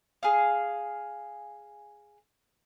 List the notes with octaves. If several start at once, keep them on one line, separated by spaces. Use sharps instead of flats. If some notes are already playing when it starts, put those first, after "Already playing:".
G#4 F5